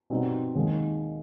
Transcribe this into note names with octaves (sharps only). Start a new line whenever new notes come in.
B2 G3 C4 D#4
D#2 D#3 G#3